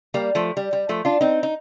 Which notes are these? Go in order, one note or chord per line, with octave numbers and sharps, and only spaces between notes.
G3 A#3
F3 A3
G3
G3
F3 A3
D4 F4
C4 D#4
D#4